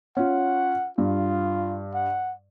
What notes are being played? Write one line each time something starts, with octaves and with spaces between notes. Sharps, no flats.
C#4 F4 F#5
G2 F4
F#5